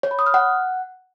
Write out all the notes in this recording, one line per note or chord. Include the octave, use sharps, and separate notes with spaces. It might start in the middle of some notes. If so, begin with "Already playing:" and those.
C#5
B5
D#6
F6
F#5